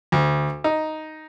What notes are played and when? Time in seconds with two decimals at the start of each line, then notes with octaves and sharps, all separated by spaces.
0.12 D2
0.64 D#4